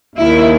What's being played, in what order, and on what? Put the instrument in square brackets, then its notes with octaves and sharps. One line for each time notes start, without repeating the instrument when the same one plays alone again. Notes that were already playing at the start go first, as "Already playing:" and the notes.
[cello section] D#2 D#3 E4